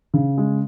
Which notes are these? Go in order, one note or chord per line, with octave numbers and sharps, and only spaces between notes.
C#3
G#3